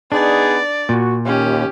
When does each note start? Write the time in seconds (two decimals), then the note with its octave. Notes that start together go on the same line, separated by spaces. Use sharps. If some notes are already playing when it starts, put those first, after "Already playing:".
0.12 B3 D4 D#4 G#4 D5
0.89 A#2 F#4
1.25 D#2 C#4 G4